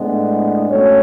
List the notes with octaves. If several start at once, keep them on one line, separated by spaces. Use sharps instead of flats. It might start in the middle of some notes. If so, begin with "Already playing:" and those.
Already playing: A2 G#3 B3 D4
A2 F#3 A3 C#4 C#5